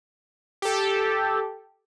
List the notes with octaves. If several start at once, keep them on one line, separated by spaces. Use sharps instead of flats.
G4 A4